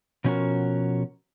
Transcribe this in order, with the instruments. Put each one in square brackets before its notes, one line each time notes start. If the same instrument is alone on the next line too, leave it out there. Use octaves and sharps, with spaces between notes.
[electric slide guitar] B2 F3 C#4 E4 F#4 A#4